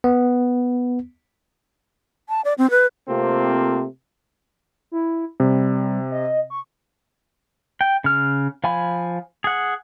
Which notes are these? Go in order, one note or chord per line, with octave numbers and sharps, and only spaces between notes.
B3
A5
D5
C4
B4
C3 A3 A#3 C4 F4
E4
C3 G3
D#5
C#6
G5
C#3 F6
F3 F5 G#5 B5
G#4 F#5